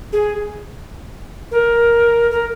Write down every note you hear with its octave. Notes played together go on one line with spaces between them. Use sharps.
G#4
A#4
A#4